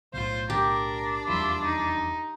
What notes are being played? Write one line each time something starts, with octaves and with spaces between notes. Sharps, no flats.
B1 A2 F4 C5
D4 G4 A#4
F1 E2 G3 E4 F4
D#4